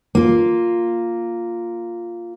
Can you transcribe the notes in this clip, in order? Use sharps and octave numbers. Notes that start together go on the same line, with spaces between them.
A#3 F4